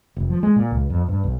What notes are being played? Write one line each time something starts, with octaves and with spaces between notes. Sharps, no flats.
F1
F3
G#3
A#2
C#2
F2
G2
B1